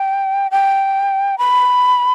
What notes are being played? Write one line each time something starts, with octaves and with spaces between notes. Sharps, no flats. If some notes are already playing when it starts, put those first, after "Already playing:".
Already playing: G5
G5
B5